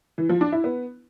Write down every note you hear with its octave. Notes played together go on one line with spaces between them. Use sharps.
E3
F3
D4
E4
B3